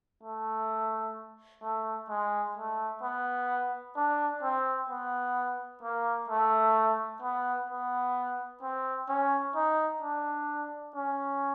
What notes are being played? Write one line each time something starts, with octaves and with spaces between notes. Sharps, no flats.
A3
A3
G#3
A3
B3
D4
C4
B3
A#3
A3
B3
B3
C4
C#4
D#4
D4
C#4